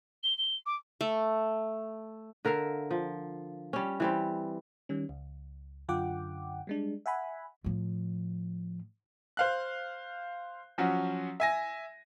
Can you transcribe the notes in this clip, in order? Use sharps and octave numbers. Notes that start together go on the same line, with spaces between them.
G7
G7
D6
A3
D3 A#4 E5 F5
F3
G3 C#4
E3 G3 C4
D#3 G3 C#4
C#2
F#2 D3 F4 F#5 G5 D6
G3 G#3 D4
E5 F#5 G#5 B5
A2 F3
C5 F5 F#6
F3 F#3 C#4 F#4
E5 G#5 A#6